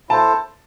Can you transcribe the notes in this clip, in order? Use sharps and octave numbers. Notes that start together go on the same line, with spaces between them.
E4 A4 C5 A5